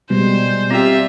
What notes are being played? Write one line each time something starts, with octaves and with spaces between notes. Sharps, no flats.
B2 G3 G#3 C5
C4 F4 G4 D5 E5